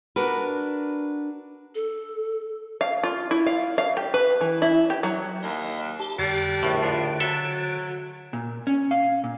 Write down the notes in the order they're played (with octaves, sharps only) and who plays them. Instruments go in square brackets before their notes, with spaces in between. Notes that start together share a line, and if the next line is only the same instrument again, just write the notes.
[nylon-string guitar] D4 F#4 A#4 B4
[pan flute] A4
[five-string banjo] F5
F4
E4
F5
F5
G4
B4
E3
E4
G4
F#3
[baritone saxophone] D#2 [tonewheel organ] D#5
[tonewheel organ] G4 A5
[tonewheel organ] F2 D3 A5 [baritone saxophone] G3
[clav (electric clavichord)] A#1 A2 [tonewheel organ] D3
[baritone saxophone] F3
[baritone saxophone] F#3 [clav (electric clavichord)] A4 E5
[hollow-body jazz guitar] A#2
C#4
F5
A#2